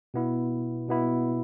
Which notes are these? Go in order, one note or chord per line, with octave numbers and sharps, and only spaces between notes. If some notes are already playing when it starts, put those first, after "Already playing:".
B2 B3 E4
B2 B3 E4